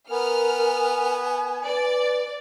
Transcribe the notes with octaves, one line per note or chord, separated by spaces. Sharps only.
B3 A#4 G#5 F6
B4 D5